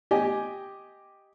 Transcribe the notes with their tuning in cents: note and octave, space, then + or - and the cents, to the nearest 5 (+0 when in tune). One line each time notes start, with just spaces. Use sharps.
G4 +0 D#5 +0 G#5 +0